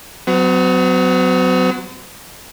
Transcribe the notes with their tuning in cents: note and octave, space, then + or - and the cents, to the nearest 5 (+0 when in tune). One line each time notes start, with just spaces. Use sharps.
F#3 +0 C4 -45